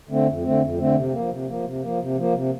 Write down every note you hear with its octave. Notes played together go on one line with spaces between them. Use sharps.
D3 A3 C4
F2
D3 A3 C4
F2
D3 A3 C4
C3
F3 A#3
C3
F3 A#3
C3
F3 A#3
C3
F3 A#3
C3